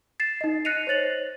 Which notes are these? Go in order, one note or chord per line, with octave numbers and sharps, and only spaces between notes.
A6 C7 E7
D#4 D#5
F#6 A#6 C7 C#7 D#7 F7
C5 C#5 A6 F#7